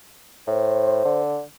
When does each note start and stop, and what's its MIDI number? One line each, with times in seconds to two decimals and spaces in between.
0.47 1.03 45
0.47 1.21 72
1.05 1.42 50